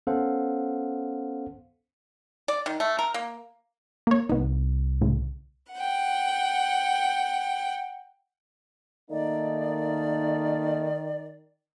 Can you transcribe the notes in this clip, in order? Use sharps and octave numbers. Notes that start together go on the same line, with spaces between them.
B3 C#4 A4 C5 F5 F#5
D5
D#3
A3
A#4
A#3
A#3 C#5
C2 B3 D#4
A2 C#3
F#5 G5
D#3 A3 A#3 D#4 D5